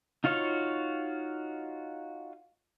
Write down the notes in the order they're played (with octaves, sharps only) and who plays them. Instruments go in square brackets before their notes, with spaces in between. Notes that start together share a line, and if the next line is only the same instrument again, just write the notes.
[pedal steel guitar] D#4 F4 F#4 C#5 F5